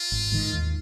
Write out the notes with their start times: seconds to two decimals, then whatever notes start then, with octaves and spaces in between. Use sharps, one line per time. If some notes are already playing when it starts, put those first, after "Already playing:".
Already playing: F4
0.12 G#1
0.32 G#2 D#3
0.52 D#2